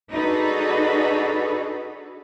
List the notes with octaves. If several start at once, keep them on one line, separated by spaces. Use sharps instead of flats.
D4 D#4 F#4 G#4 A4 B4